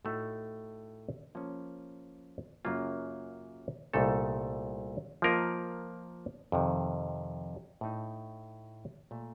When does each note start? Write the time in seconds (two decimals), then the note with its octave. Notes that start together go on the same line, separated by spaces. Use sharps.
0.05 A2 A3 D#4 F#4 A4
1.35 F3 A#3 C#4
2.65 F#2 C#3 F#3 A#3 F4
3.93 C2 A#2 A3 D#4 A4
5.22 F3 A#3 F4 A#4 D#5
6.52 F2 C3 D#3
7.81 A2 A3 D#4
9.11 A#2 A3